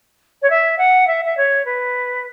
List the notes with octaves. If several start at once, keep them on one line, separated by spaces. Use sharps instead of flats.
C#5
E5
F#5
E5
E5
C#5
B4